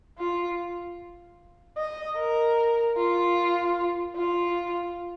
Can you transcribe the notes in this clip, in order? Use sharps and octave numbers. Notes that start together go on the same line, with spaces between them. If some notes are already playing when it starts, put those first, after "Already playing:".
F4
D#5
A#4
F4
F4